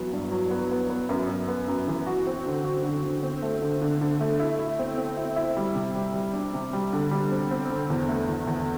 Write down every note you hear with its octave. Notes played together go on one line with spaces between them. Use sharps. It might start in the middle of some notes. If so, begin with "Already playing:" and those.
Already playing: E3 F#3 B3
G2
F#3
B3
B3
B3
F#2
F#2
B3
F#2
E3
F#4
C4
D3
F#4
D3
D3
C4
A3
D3
D3
D3
A3
E4
E4
C4
C4
E4
E4
G3
C3
G3
G3
D4
C3
G3
D3
G3
C4
C4
D3
E2
A3
E2
E2